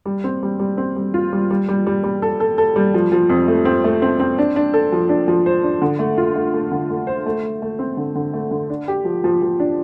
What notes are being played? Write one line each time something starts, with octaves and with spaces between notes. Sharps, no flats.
G3
C4
G3
G3
C4
G3
F4
G3
G3
G3
G3
G3
A4
A4
A4
G3
F3
F3
F2
A3
C4
A3
C4
C4
D4
D4
A4
F3
D4
F3
C5
D4
D3
A3
F4
A3
A3
D3
A3
C5
A3
A3
A3
C4
D3
D3
A3
D3
D4
G4
F3
F3
F3
D4